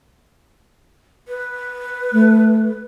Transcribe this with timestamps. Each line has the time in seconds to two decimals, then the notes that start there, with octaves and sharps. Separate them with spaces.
1.28 B4
2.12 A3